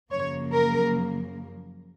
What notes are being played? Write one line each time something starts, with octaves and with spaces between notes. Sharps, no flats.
F#2 C#3 F3 A#3 C#5
A#4